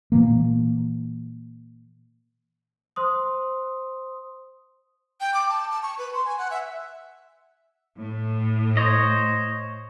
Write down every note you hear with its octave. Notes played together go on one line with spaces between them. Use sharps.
A#2 E3 A#3
C5 C6 D#6
G5
D6
A5
A5
C#6
B4
C6
G#5
F#5
E5
A2
C5 C#5 D#5